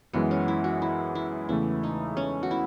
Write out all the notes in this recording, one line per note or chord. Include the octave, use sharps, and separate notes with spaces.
F#2 E3 G#3 B3
C#4
E4
F#4
E4
E4
E2 C#3 E3 A3 E4
D#4
C#4
F#4
E4